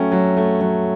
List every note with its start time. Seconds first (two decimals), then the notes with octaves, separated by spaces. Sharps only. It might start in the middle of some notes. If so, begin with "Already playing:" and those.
Already playing: F#3 A3 C#4 G5
0.12 F#3
0.37 A3
0.61 F#3